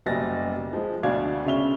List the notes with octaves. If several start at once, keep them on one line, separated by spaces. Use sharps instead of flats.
F#1 B2 G3 D#5 A6 A#6
F3 G#3
D2 B2 D4 D5 F5 G#6
C#3 C#4 E5 F7 G7